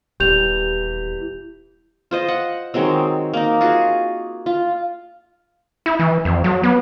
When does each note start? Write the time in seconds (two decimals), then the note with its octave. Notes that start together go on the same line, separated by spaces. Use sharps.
0.20 D#1 E2 E3 G3 G4 G6 F7
2.11 F4 C5 D#5
2.28 F#5
2.74 D#3 F#3 G#3 C4
3.34 A#3 D#4
3.61 F4 F#4 G#4
4.46 F4
5.86 E4
5.99 E3
6.25 F2
6.44 F#3
6.63 B3